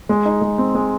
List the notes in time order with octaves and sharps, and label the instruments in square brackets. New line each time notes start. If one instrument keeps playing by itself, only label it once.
[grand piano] G#3
D#4
G#3
C4
G#3